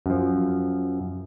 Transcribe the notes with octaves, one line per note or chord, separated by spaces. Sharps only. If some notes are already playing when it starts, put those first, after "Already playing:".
F#2 F3